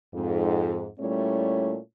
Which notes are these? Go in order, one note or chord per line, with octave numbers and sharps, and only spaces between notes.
F2 G#2
A#2 G3 A3 C#4 E4 C#5